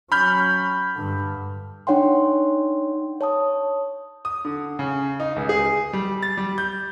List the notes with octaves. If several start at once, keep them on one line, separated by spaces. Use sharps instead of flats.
F#3 C#4 B5 F6 G6
G2 D3
D4 D#4 C#5 F#5 G5 C6
C#5 A5 D#6
D#6
D3
C#3
D#4
C#2
G#4
G3
A6
G3
G6